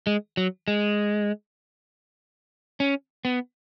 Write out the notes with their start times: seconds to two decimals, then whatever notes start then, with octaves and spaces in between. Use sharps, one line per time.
0.07 G#3
0.37 F#3
0.68 G#3
2.80 C#4
3.25 B3